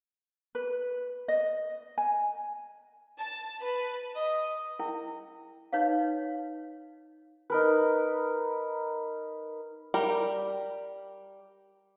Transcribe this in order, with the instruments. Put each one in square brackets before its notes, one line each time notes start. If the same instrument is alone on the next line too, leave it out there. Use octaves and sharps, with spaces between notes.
[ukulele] B4
D#5
G#5
[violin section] A5
B4
[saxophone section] D#5
[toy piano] E4 A#4 G5
D#4 B4 C#5 D#5 F5
[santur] D#4 A#4 B4
[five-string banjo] G3 G4 A#4